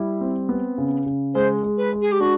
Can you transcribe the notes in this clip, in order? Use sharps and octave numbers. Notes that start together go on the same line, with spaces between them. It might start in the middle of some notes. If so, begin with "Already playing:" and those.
Already playing: G3 E4
C4
B3
C#3
C#3
G#3 C5
G#3
B4
G#3
G#4
G4
D4 F#4